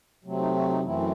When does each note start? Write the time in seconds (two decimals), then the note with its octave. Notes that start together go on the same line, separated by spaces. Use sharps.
0.24 C3 F#3 A3 C4
0.38 D#4
0.54 F#4
0.69 D#4
0.84 F#2 E3 A3 C4 E4
0.99 E4